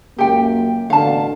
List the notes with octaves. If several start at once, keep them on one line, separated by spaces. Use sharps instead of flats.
C#2 F#2 A#3 G4 G5
A1 B2 D3 F5 A5